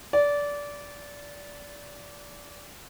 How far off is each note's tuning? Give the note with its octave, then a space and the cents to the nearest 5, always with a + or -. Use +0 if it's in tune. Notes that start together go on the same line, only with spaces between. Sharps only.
D5 -20